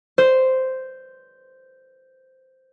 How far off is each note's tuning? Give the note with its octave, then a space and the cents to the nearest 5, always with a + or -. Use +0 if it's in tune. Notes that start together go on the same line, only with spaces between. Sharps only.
C5 -5